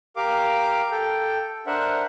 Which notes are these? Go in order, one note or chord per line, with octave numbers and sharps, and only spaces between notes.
G4 A#4 F5 D6
A4 G5
D4 A#4 C5 E5 F#5